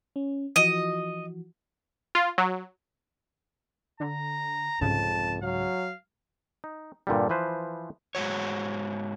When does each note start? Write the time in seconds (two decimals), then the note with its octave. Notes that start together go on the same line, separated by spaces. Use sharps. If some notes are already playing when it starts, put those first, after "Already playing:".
0.16 C#4
0.56 E3 F3 F#4 D#5
2.15 F4
2.38 F#3
4.00 D3 A#5
4.81 C2 F2 G#2 C#3 A5
5.43 F#3 F5
6.64 D#4
7.07 G2 A#2 D3 G3
7.29 E3 F3 B4 C5
8.15 G#2 B2 F#4 C#5